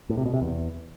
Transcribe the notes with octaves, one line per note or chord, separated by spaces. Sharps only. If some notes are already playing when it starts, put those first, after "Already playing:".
A2
C3
B2
C3
E2